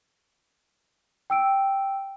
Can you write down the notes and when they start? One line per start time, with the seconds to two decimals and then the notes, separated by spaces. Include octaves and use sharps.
1.30 G5 E6 D7